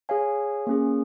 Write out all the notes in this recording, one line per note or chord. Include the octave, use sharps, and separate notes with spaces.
G#4 C#5 F5 G#5
A#3 C#4 G#4